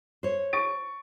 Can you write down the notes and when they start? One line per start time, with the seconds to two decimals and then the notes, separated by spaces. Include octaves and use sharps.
0.23 C5 C#5
0.53 C#6 A6 D7